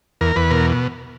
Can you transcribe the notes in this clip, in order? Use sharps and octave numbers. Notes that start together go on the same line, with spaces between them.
E2 A#4
E2 B4
B2 A#4